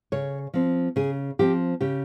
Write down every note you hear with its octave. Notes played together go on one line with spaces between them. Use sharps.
C#3 C#5
F3 C4
C#3 G#4
F3 C4 G4
C#3 G4